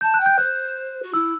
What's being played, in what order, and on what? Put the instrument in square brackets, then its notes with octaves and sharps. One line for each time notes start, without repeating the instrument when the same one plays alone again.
[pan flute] A5 [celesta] G6
[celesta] F#6
[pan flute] G5
[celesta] G6
[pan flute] C5 [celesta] F#6
[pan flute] F#4
[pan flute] E4 [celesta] E6